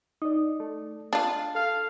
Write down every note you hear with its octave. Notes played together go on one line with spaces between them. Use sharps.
D#4 D5 D#6
A3
D4 F4 F5 A5
A4 F5 F6